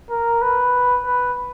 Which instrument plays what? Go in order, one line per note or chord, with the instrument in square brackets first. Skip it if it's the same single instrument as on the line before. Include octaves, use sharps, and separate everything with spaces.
[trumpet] A#4
B4
B4